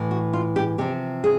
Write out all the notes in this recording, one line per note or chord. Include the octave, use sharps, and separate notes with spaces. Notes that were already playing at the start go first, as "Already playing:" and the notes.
Already playing: A2 E3
F#4
F4
G4
C3 F3 G4
G#4